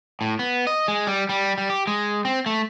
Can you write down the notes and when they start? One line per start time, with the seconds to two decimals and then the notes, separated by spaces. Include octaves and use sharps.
0.21 A2
0.39 B3
0.67 D#5
0.88 G#3
1.07 G3
1.29 G3
1.58 G3
1.70 G4
1.87 G#3
2.25 C4
2.46 A3